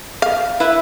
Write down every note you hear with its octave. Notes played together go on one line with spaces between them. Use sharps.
F5
E4 B4 E5